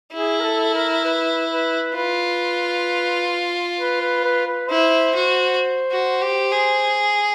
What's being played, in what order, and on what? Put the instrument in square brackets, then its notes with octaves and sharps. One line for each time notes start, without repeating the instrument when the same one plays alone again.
[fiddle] E4 [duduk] G#4
[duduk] A#4
A4
A#4
B4
B4
[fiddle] F4 [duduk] B4
[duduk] B4
B4
B4
B4
[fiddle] E4 [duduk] C5
[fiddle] F#4
F#4
G4
G#4